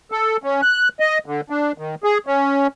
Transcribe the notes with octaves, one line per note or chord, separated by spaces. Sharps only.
A4
C#4
F#6
D#5
D3
D4
D#3
G#4
C#4